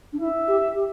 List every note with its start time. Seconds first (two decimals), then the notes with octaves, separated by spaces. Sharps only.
0.13 D4
0.20 E4 E5
0.48 G4
0.75 G4